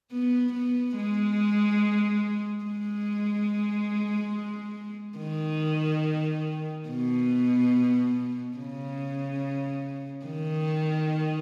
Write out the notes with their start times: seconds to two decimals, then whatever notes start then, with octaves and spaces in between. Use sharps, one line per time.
0.12 B3
0.53 B3
0.96 G#3
2.65 G#3
5.18 D#3
6.88 B2
8.57 C#3
10.26 D#3